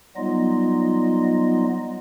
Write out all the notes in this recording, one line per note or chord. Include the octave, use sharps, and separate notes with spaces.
F#3 G3 B3 D#4 F4 D#5